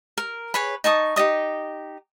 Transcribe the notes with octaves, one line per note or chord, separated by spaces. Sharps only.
A#4
G#4 B4 C#5 B5
D#4 A5 C#6 D#6
D#4 G4 D#5 D#6